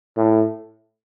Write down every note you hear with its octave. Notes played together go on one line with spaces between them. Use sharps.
A2